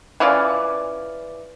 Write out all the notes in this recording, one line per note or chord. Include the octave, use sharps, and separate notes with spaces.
E3 C#4 F4 D5